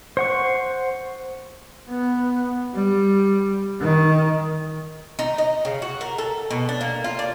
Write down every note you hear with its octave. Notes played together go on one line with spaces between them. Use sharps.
C5 F#5 C#6
B3
G3
D#3
D#4
D#5
C#3
F#4
A#4
A4
B2
D4
A#3
F4
D5